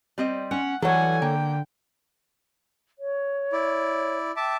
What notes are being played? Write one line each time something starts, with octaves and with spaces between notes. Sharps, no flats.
G3 C4 D#5
C#4 F#5
E3 F#3 G3 A4 C#5 F#5 G#5
D3 A#3 G5
C#5
E4 D5
E5 G5 A5 D6